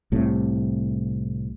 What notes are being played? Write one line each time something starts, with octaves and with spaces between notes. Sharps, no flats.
C2 A2 C3